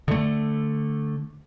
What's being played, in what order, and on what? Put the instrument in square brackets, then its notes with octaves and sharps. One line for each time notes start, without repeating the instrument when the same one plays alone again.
[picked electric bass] D3 A3